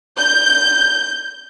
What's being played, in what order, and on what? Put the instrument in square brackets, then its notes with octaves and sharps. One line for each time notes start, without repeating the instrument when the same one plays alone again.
[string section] G6